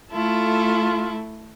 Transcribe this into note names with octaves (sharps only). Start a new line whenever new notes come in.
A3 E4 F4 A4